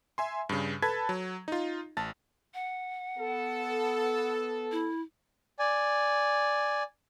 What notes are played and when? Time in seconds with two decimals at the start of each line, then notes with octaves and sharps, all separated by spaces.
0.18 E5 G#5 C6
0.49 G2 C#3
0.82 A4 B4 A5 B5 G#6
1.09 F#3
1.48 D#4 F4
1.97 A1 A5 A6
2.54 F#5
3.18 B3 A4
4.72 E4
5.59 D5 G#5